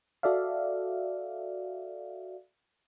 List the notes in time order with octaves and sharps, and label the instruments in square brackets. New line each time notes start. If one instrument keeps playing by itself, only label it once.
[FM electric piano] F#4 A4 D5 E5 F5